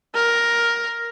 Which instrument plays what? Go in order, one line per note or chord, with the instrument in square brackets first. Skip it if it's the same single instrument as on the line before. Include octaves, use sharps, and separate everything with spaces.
[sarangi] A#4